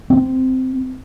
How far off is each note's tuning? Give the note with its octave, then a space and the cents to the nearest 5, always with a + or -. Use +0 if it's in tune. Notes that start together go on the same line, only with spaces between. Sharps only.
C4 -15